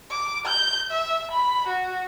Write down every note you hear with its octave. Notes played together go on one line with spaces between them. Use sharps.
D6
G6
E5
B5
F#4